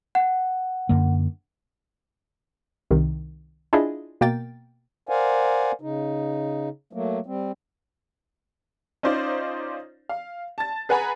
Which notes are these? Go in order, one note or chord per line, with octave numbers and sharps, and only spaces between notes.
F#5
F#2 D3 A#3
C2 C3 D#3
D4 E4 F4 G#4 D#5
B2 A#3 A#4 G5 A6
A#4 C5 D5 F5 F#5 G#5
C#3 D#4
F#3 A3 A#3
G3 C4
C#4 D#4 F4 C5 D5
F5
A5 A6
G#4 B4 F#5 G#5 A#5 B5